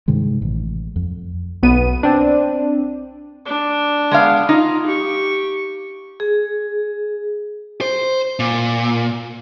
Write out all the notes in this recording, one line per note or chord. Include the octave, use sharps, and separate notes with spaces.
G2 C3 D#3 G#3
A1
F2
B1 B3 D#7
C4 D4
D4
G#3 B3 F5
D#4 F4
G4 C#6
G#4
C5
A#2